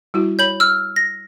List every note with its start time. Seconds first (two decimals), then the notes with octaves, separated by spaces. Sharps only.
0.14 G3 E4 F#4
0.39 C#5 B5 G6 F#7
0.60 E6 F6
0.96 A#6